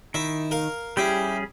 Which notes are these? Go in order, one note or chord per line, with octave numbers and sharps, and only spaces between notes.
D#3 E4 E5
A#4 F5
G3 C#4 E4 G4 G#4